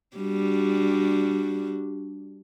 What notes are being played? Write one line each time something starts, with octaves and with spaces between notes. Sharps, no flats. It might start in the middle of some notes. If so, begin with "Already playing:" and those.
G3 D4 F#4